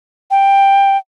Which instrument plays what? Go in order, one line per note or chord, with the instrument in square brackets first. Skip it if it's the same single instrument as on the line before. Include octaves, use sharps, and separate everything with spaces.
[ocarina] G5